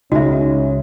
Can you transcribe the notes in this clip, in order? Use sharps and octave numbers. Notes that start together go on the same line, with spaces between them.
C#2 C#3 G#3 C#4 D#4 F#4 E5